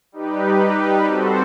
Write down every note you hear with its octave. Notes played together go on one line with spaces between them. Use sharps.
G3 D#4 G4 B4
G3 C4 F#4 A4 C5